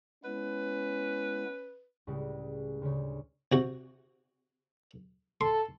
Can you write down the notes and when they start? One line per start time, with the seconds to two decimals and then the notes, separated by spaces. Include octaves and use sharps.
0.24 G#3 B3 C#4 E4 B4
2.07 C#2 A2 C#3 G3 G#3
2.82 D2 C#3 C#5
3.52 C3 F#4
5.41 A4 C6